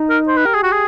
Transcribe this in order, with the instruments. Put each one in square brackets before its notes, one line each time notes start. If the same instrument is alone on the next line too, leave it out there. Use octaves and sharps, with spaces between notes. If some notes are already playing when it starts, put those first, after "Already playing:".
Already playing: [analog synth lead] D#4
[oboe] A#4
C5
B4
[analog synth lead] G4 [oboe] A#4
[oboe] G#4
F#4
G#4